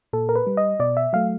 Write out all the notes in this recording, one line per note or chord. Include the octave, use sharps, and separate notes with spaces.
A#2 A4
A#4
B4
G3
D#5
B2 D5
E5
F#3 A3 F5